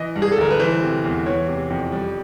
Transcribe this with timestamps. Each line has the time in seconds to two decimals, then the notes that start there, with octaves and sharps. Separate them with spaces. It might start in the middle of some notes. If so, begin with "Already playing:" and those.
Already playing: E3 D#5
0.16 G2
0.22 G#4
0.32 A4
0.38 G1 A#4
0.50 B4
0.59 E3 C5
0.82 C3
1.04 E2
1.26 E3 C#5
1.48 C3
1.70 F2
1.92 G3